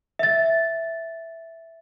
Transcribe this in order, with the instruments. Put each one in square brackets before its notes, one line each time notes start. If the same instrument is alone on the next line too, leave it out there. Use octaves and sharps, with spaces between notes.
[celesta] E5 A6